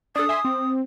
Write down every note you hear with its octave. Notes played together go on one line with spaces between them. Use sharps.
D4 A4 D#6
E5 G#5 C6
C4